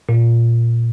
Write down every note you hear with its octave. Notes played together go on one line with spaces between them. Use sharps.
A#2